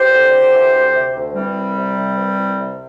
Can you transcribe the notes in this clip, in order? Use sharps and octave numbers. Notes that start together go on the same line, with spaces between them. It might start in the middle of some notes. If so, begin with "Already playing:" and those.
Already playing: E2 G4 C5
D3
D3
E3
D2
C3
D2
E3 G3 C4
C2
C3
C2
E3
C2
C3